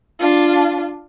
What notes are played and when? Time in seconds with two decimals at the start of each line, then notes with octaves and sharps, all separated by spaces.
0.20 D4 F4